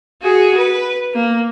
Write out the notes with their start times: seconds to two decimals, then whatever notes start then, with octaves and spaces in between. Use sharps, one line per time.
0.22 F#4 G#4
0.57 B4
1.14 A#3